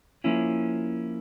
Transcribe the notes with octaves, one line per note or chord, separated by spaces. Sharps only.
F3 A#3 C#4 E4